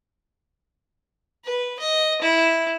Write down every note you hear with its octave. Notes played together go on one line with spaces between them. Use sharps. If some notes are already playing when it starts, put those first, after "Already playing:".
B4
D#5
E4